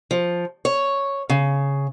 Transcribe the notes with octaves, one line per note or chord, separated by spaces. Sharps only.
F3
C#5
C#3